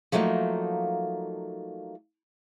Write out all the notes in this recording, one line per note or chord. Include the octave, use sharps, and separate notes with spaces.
F3 F#3 A3 A#3 D#4